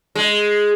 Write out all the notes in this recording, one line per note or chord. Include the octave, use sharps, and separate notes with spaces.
G#3